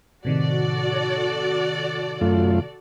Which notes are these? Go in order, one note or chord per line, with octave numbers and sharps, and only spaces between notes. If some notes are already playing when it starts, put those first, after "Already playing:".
A2 C3 D#3 F#4 A4 D5
F#2 A3 F4